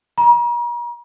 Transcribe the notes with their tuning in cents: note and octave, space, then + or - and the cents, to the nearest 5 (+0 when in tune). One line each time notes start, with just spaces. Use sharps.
A#5 +40